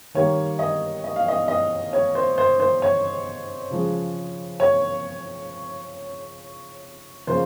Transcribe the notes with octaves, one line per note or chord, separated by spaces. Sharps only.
D#3 G3 A#3 C#5
D#5
D#5
F5
D#5
D#5
C#5
C5
C5
C5
C#5
C#3 F3 G#3
C#5
C#3 F3 A#3 C5